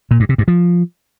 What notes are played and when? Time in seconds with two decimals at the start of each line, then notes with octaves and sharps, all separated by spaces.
0.11 A#2
0.20 G2
0.29 C3
0.38 G2
0.48 F3